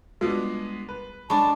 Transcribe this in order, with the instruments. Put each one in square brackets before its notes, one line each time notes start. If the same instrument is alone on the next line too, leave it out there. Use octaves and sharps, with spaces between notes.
[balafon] G3 F4 F#4 [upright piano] G#3 B3 D4
[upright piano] B4
[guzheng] G#3 D4 [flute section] A5 [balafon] B5 C#6